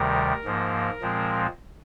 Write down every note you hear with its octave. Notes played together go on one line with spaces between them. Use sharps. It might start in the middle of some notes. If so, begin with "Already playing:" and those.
Already playing: D2 C3 D#3 G3 A#4
G#2 F3 A#3
A#2 F3 G#3 C4